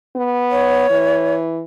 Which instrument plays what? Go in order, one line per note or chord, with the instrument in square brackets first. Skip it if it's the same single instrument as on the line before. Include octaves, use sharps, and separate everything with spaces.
[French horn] B3
[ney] C#5
[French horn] E3